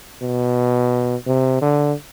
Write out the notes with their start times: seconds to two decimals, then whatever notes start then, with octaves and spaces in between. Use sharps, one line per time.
0.22 B2
1.27 C3
1.62 D3